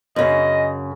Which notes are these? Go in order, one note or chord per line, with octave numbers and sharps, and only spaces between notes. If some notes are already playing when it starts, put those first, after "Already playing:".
F#2 C#3 D#5